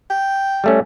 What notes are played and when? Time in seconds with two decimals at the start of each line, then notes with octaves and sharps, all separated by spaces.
0.10 G5
0.64 G3 A3 C#4